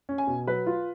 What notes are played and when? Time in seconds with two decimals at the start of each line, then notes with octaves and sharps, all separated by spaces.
0.09 C#4
0.18 G#5
0.27 B2
0.47 F#3 B4
0.67 F4